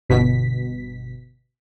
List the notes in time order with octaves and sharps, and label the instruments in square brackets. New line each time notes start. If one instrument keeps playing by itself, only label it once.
[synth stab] G1 B2 B6